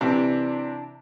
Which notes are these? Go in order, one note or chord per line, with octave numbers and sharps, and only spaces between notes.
C3 E3 D4